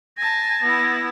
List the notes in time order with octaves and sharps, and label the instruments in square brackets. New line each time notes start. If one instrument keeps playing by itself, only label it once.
[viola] G#5 A5 [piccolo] A#6
[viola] B3 E4